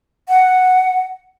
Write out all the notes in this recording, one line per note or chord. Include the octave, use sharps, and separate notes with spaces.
F#5